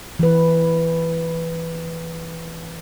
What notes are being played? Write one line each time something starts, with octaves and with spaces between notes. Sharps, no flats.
E3 B4